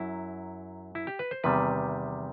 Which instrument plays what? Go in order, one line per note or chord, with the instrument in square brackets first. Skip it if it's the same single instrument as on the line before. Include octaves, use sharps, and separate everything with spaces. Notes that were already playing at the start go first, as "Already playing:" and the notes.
Already playing: [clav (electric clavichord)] F#2 F#3 E4
E4
G4
B4
C5
E2 C3 D#3 G3 B4